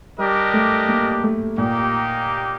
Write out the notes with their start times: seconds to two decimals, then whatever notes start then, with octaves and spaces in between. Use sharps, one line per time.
0.18 G3 D4 G4 A#4 D#5
0.53 A3
0.88 A#3
1.24 A3
1.58 A#2 A#3 D#4 G4